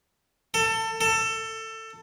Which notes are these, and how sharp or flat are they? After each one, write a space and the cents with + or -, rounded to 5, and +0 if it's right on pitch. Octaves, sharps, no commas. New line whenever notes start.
A4 +25
A4 +20